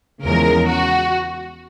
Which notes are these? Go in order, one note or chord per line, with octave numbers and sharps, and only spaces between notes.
E2 C#3 F3 G#3 A#4
F#4